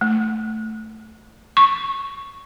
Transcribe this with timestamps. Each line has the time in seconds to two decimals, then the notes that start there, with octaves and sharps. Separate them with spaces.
0.01 A3
1.57 C#6